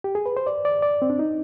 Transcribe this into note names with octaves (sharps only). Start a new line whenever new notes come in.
G4
G#4
B4
C5
D5
D5
D5
C4
D4
D#4